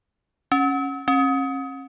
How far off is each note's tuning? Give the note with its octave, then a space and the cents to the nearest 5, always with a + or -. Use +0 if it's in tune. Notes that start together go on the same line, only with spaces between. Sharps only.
C#4 -10
C#4 -40